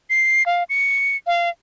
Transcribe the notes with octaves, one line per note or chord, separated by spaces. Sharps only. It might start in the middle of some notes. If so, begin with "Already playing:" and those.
C7
F5
C#7
F5